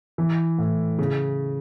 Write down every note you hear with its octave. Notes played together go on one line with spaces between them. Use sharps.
E3
A2
C#3